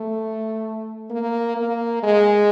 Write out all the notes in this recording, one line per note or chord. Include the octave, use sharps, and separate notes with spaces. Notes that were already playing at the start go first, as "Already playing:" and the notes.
Already playing: A3
A#3
A#3
G#3